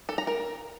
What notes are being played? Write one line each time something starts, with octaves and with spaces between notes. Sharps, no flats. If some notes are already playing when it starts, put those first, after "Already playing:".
A4
A#5
A#4